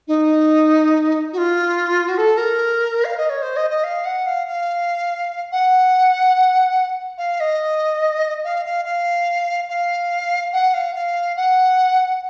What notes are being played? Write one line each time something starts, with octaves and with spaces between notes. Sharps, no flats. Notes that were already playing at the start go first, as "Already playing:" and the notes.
D#4
F#4
F4
F#4
A4
A#4
F5
D#5
C#5
C5
D#5
D#5
F5
F#5
F5
F5
F#5
F5
D#5
F5
F5
F5
F5
F#5
F5
F5
F#5